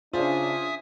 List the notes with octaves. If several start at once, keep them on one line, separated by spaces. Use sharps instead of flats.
C#3 D4 F4 C5 E5 G#5 D#6